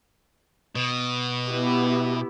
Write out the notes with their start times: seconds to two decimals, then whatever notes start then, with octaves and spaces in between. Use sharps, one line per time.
0.75 B2
1.49 B3 E4 G4